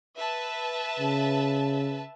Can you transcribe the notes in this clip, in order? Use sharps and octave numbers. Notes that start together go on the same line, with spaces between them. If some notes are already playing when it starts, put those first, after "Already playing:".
B4 E5 A5
C#3